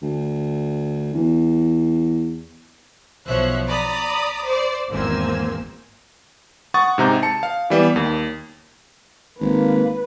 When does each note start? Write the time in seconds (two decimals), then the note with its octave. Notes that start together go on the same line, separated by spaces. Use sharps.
0.02 D2
1.14 E2
3.26 B1 F3 C5 C#5 E5 F#6
3.67 D5 A#5 B5 D#6
4.45 C5 D5
4.90 G#1 E2 A#3 C4 G#5 E6
6.74 F#5 C#6 D#6 A6
6.98 G#2 C3 A#5 G6
7.23 A5 C#7
7.43 F5
7.70 E3 G3 B3
7.96 D#2
9.40 G#1 A#3 B4